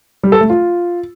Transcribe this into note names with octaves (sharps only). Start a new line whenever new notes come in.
G3
A4
A3
F4